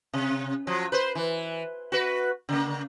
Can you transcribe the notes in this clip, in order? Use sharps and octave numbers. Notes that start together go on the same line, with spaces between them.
C3
F3 F#3
B4 C5
E3
F#4 B4
C#3 A#3